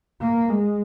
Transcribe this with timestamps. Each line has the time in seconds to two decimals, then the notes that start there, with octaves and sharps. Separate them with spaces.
0.21 A#3
0.49 G#3